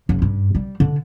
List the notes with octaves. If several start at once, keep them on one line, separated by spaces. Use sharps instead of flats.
F#1
G2
G3
D3